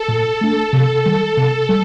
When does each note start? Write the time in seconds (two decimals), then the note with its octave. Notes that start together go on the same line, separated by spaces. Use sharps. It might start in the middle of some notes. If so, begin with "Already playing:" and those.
Already playing: A4
0.08 A#2
0.41 A3 D4
0.72 C3 A4
1.06 D#3 G3
1.37 C3 A4
1.69 G3